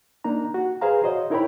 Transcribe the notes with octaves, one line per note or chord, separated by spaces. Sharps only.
A#3 D4 D#4 A#5
F#4
G#4 B4 C5 F5 A#5
F#4 C5 C#5 D#5
D#4 E4 A#4 C#5 G5 B5